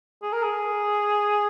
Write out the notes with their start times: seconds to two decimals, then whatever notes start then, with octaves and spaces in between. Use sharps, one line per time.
0.22 G#4
0.33 A#4
0.43 G#4